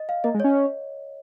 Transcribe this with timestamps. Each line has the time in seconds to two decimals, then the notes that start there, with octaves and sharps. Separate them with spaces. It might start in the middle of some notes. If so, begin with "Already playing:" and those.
Already playing: D#5
0.09 F5
0.24 A#3 D#5
0.34 G#3
0.40 C#4 C#5